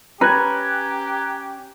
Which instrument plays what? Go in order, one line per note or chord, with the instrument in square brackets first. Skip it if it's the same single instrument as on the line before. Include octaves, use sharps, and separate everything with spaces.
[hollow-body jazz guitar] C#4 [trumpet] G4 [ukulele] B4 [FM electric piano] A#5 F#6 G#6